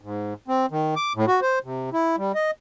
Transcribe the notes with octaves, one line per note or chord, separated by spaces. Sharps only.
G#2
C4
D#3
D6
A2
F#4
C5
C3
E4
G3
D#5